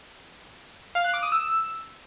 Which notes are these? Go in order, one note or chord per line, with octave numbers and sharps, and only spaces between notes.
F5
F#6
D6
D#6
E6